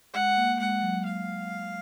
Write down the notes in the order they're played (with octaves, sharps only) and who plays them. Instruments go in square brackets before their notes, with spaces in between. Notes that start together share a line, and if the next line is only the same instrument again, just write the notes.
[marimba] G#3 [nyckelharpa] F#5
[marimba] A#3
[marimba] G#3 [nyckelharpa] F#5
[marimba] F#3
[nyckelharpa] F5